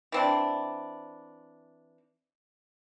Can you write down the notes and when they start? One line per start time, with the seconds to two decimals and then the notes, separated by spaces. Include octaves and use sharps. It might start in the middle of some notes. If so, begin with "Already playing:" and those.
0.12 E3 C4 D4